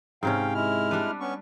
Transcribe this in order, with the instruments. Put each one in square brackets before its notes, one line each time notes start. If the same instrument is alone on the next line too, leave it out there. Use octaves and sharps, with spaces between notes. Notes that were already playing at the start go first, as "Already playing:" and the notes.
[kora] G#2 C3 C#4 [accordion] F5 G5
[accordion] G#3 E4 F6
[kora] G3 D4 B4
[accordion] B3 C#4 C#6